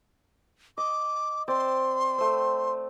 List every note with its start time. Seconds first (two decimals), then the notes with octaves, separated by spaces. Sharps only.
0.78 D#5 D6
1.48 C4 D5 C6
2.18 A3 C4